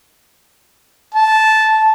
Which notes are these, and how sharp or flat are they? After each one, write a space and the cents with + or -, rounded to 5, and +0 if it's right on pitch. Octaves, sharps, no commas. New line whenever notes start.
A5 -10